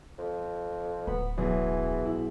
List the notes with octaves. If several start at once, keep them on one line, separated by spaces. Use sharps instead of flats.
F2
D1 B3 B5
B1 E3 G#4 G#5
E4